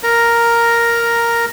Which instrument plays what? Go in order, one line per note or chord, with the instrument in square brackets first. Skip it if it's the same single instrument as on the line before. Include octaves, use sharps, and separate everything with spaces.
[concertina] A#4 A#5